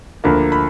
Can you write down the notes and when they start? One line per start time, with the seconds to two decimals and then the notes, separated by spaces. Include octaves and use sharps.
0.24 D2 D3 F3 A#3 B5
0.52 B5